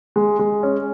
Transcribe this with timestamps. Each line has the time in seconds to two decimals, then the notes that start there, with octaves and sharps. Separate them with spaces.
0.16 G#3
0.39 G#3
0.63 C#4